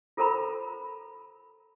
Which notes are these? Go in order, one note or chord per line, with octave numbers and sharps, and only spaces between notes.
F4 A4 A#4 C5 A#5 B5